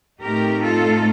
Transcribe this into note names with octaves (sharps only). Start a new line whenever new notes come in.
A2 A3 C4 D#4 G4 A#4
F4 A4